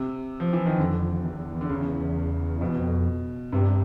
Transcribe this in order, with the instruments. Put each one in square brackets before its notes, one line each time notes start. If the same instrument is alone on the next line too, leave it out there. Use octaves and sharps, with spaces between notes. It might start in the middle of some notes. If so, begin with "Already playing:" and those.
Already playing: [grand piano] C3
F3
E3
D#3
[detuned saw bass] F2 [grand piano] D3
[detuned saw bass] E2
[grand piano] D3
[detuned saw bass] E2 [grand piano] C#3
[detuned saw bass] F2 [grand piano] B2
[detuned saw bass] E2
F2
[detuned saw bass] G2 [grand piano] C3